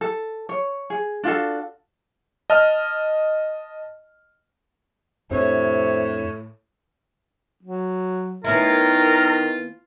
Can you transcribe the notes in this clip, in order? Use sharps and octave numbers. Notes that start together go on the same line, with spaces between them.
A4
C#5
G#4
D4 F4 F#4 A4
D#5 A5 F6
F2 A2 C3 C4 D4 C#5
F#3
D#3 B3 C#4 E4 F4 A#4